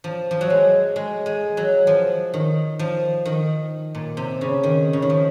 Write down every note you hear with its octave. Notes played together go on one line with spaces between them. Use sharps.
F3
F3
F#3
G#3
G#3
G#3
F#3
F3
D#3
F3
D#3
A#2
C3
C#3
D#3
C#3
D#3
F3